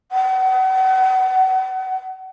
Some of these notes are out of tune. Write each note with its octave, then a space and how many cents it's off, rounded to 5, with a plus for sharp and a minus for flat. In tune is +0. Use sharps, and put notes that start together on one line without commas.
F#5 +35